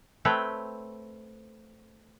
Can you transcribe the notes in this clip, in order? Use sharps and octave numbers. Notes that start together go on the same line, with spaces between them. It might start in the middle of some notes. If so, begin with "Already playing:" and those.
A3 C4 B4 C#5 G5